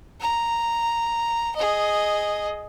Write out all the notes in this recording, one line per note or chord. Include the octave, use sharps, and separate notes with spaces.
A#5
G#4 D#5